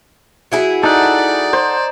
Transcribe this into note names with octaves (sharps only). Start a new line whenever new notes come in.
F#3 E4 G#4
D#4 A4 D5 F#5
C5